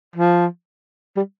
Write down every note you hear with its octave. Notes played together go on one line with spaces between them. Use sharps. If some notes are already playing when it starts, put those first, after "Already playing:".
F3
G3